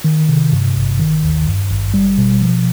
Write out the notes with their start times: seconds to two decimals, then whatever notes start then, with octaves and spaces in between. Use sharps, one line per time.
0.04 D#3
0.29 C3
0.52 G2
0.76 G#1
1.00 D#3
1.23 D#2
1.47 G2
1.71 G#1
1.94 G3
2.18 B2
2.41 F3